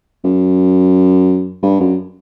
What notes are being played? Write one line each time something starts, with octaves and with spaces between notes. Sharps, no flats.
F#2
G2
F#2